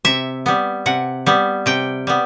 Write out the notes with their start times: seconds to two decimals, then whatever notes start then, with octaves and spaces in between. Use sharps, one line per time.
0.05 C3 E5
0.46 G3 B3
0.86 C3 F#5
1.26 G3 B3
1.66 C3 G5
2.07 G3 B3